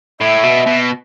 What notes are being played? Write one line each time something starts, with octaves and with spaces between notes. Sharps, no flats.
A2 E5
B2
B2